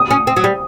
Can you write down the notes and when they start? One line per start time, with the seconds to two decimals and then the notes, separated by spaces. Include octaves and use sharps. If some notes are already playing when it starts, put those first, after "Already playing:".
Already playing: D#6
0.11 C#4
0.27 C4
0.37 F#3
0.44 G3